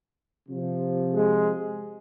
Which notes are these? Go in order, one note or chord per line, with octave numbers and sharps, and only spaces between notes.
C3 F3
G#3